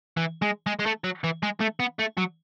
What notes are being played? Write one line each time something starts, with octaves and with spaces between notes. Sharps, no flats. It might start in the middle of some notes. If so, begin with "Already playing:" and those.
E3
G#3
G#3
G#3
A3
F#3
E3
G#3
A3
B3
A3
F#3